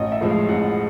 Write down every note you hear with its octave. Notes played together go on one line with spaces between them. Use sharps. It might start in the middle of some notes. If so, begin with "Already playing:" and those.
Already playing: A1 D#5
E5
A2 F3 G#3
F5
A1 F#5